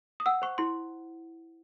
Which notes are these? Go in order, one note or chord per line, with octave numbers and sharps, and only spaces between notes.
D#6
F#5 E6
C5 C#6
E4 C6